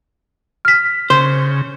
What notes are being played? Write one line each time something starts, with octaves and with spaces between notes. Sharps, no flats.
F6 B6
C#3 C5